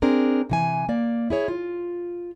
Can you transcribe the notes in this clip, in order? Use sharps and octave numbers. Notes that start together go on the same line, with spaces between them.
C4 D4 G#4 A#4
C3 E3 G#5
A#3 D5
E4 G#4 C#5
F4